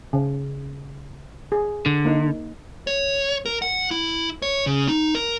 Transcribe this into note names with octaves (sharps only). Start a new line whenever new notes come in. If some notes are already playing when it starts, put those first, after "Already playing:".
C#3
G#4
D3
A#3 D#4
C#5
A#4
F#5
E4
C#5
C#3
D#4
A#4